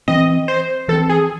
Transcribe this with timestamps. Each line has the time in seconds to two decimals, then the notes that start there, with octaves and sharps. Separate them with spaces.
0.08 E3 C4 D#5
0.48 C5
0.88 E3 A4
0.92 C4
1.09 G#4